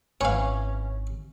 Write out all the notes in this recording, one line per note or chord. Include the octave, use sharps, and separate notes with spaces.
G#1 E3 C#4 C#5 F5